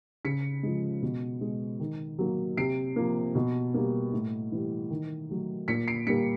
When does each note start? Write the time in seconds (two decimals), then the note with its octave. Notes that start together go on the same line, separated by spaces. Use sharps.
0.25 C#3 B6 C#7
0.63 F3 G#3
1.02 B2
1.41 G#3
1.80 D#3
2.19 F#3 A#3
2.57 C3 C7 D7
2.96 F3 A#3
3.35 B2
3.74 G3 A#3
4.13 A2
4.52 E3 G3
4.90 D#3
5.29 F#3 A3
5.68 A#2 B6 C#7
5.88 C7 D7
6.07 G3 A#3 B6 C#7